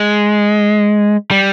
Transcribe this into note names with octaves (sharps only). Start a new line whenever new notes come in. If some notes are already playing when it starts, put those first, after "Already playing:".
Already playing: G#3
G3